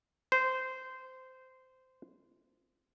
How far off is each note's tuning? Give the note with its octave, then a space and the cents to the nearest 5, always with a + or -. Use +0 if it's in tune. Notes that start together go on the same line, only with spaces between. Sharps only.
C5 -15